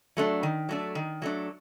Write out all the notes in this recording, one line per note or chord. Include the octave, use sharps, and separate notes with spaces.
F#3 A3 D4
D#3
F#3 A3 D4
D#3
F#3 A3 D4